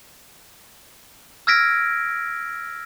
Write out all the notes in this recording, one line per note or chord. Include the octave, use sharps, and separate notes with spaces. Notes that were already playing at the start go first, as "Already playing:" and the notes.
E6 F6 G#6 A#6 B6 D7